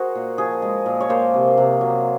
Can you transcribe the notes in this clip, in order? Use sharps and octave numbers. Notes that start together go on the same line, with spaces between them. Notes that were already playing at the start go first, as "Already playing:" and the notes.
Already playing: F#4 G#4 A#4 C5
A#2
F3 G#4
G#3
A#2
C#5
A#3 C5
C3
C3
F#3